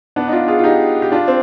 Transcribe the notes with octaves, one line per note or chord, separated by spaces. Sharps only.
B3 D4
D#4
D4 F4
F4 G#4
F4
D#4 G4
G4
D4 F4
C4